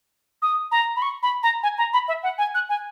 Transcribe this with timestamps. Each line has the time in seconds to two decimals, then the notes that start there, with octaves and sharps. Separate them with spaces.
0.42 D#6
0.71 A#5
0.96 B5
1.02 C#6
1.23 B5
1.43 A#5
1.63 G#5
1.78 A#5
1.93 B5
2.08 E5
2.23 F#5
2.38 G#5
2.54 F#6
2.69 G#5